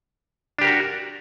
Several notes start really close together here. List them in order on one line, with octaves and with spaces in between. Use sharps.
D4 G4 A#4 F#4